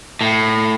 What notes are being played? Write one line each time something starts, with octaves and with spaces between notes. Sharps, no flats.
A2